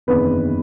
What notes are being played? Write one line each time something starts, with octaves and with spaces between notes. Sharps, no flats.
F#1 E2 C3 D#3 B4